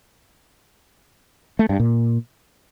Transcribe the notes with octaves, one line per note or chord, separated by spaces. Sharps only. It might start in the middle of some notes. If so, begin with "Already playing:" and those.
A3
G2
A#2